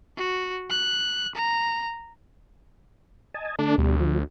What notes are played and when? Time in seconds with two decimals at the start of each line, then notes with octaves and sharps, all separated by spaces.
0.17 F#4
0.70 F#6
1.35 A#5
3.34 D#5 G#5 A5
3.59 D3 A3 D4
3.78 D2 B2 G3
4.00 F3